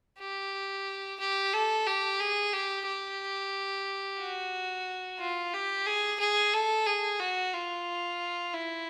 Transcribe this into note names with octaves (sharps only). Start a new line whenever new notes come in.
G4
G4
A4
G4
G#4
G4
G4
F#4
F4
G4
G#4
G#4
A4
G#4
F#4
F4
E4